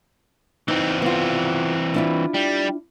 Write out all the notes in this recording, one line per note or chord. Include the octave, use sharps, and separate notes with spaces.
E3 C4 D#4
B3 F4
D4 E4 F4
G3